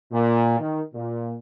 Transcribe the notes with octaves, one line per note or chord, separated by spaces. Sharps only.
A#2
D#3
A#2